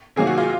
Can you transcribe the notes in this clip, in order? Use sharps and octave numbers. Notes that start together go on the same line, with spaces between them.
C3 D#3 F#3 A#3 G#4
F#4
F4